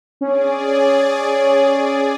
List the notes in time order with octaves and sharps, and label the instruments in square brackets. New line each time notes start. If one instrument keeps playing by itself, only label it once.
[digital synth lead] C#4 [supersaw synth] G#4 D5